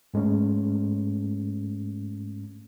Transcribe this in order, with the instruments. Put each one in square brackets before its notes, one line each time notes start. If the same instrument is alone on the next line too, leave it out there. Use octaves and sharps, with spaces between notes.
[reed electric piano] G#2 G#3 A3 C#4